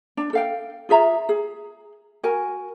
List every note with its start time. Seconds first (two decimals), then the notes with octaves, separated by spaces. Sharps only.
0.17 D4
0.33 A4 F5 G5
0.89 F4 G#4 E5 A#5
1.29 G#4
2.23 F#4 A#4 G#5